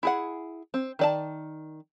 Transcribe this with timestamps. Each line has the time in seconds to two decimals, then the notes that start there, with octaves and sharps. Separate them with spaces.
0.03 E4 G#4 F#5
0.74 C4
0.99 D#3 D5 A5